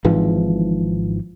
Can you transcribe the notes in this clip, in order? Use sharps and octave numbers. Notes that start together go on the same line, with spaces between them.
G#1 G#2 E3 F3